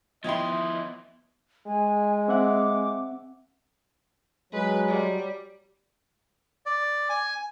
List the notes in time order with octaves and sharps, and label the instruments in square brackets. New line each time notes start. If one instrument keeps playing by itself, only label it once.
[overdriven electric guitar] F3 E4 [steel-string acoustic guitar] B3 E5 G5 [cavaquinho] C#5 C6 [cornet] D#5
[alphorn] G#3 [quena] G#5
[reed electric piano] C4 E5 F#5 [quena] D6
[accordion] F#3 [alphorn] G#3 [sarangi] B4
[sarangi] G3
[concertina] D5
G#5